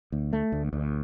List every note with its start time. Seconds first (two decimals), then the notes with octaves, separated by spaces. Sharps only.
0.12 D2
0.33 A3
0.52 D2
0.73 D2